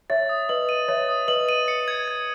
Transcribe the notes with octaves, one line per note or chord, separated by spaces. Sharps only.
C#5 E5 A6
D#6
B4 D#5 F#7
D#7
C#5 E5 A6
D#6
B4 D#5 F#7
D#7
C#7
G#6
G#6